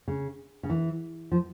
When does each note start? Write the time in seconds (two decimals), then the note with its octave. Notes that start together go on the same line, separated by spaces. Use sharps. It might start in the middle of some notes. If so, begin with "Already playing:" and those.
0.08 C#3
0.63 C#3
0.70 E3
1.32 F3